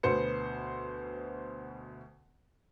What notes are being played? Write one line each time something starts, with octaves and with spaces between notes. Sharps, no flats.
D2 B2 B3 C5 C#7